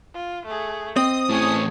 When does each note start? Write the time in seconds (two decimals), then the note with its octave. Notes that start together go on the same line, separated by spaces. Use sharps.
0.14 F4
0.46 A3 G#4
0.96 C4 D#5 D#6
1.30 A2 E3 G#4 C#5